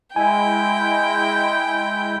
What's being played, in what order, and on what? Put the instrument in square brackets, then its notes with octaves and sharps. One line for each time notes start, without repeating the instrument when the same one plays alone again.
[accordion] G#3 E4 [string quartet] G5 [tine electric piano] G#5